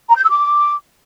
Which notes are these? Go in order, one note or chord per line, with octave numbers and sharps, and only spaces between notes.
A#5
G6
E6
D6